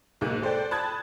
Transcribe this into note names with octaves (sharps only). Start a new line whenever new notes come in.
B1 G#2 G#3 A#3 F#6
A4 C5 D5 G5
A5 B5 D#6 F#6 G#6 A6